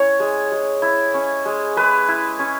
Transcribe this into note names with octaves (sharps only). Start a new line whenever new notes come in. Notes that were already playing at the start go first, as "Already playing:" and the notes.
Already playing: C#4 E4 C#5
G#3
G#3
E4
C#4
G#3
G#3 B4
E4
C#4